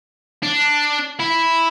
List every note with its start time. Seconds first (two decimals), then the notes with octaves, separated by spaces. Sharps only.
0.43 D4
1.20 E4